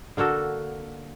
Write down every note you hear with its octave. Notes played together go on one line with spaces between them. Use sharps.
D3 A#3 F#4 A4